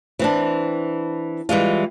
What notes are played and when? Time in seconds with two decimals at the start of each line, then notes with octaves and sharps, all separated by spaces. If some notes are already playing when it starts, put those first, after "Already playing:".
0.19 E3 C4 D4
1.49 E3 G3 G#3 F4